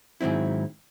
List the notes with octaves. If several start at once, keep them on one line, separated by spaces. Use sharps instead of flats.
G#2 D#3 F#3 C4 E4